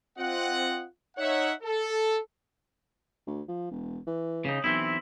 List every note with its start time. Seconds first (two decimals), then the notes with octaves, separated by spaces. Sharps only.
0.18 C4 F4 D#5 F#5
1.18 D#4 C#5 E5 F#5
1.63 A4
3.27 D2
3.48 F3
3.71 E1
4.07 E3
4.45 C#3 D#4
4.64 B1 E3 C4 E4